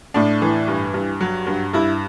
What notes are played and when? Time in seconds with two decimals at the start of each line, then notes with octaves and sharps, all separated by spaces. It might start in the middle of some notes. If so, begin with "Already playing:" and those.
0.14 A2 D4
0.42 E3
0.68 G2
0.94 G2
1.21 F#3
1.47 G2
1.73 G2 E4